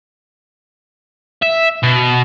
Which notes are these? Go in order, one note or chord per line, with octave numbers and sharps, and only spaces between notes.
E5
B2